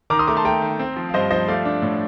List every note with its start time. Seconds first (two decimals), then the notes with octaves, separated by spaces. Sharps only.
0.10 D#3 A#5 D6
0.19 C6 D#6
0.27 A3 A#5 D6
0.37 A5 C6
0.45 A3 G5 A#5
0.62 D#3
0.79 C4
0.97 F3
1.09 F5
1.14 G2 C5 D#5
1.30 F3 C5 D#5
1.48 A3 D5 F5
1.65 D4
1.82 A2